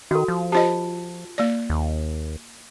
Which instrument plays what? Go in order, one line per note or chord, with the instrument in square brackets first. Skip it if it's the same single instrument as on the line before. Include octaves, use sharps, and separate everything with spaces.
[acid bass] D#3 [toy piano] F#4 A4
[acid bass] F3
[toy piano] F4 A5 [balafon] G4 C5 D#5
[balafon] A#3 D5
[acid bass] D#2